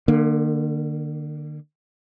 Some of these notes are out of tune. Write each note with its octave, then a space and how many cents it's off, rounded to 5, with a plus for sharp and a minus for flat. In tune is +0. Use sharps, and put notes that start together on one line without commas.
D3 +40 A#3 -10